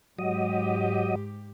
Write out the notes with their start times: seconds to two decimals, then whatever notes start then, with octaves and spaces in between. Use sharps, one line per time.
0.19 G#2 F#3 G4 D#5